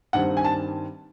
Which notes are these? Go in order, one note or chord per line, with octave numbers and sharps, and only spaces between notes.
G2 D#3 G3 C4 F#5
G#5
A5